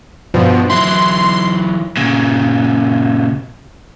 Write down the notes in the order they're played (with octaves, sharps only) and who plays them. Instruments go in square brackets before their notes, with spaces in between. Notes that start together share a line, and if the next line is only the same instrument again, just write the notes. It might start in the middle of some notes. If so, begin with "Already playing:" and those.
[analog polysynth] G2 B2 F3
[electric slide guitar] E3 F#3 E4 [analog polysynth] C6
[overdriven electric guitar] A#2 C#3